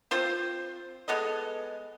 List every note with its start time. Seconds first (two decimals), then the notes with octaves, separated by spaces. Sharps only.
0.11 C4 F4 C5
1.08 G#3 B3 A4 D#5